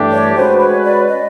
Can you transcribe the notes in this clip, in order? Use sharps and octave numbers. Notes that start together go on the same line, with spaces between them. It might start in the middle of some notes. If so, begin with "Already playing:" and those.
Already playing: G2 E3 A3 D4 G4
C#5
G#3 C#4 F#4 B4 C5
C#5
D5
D#5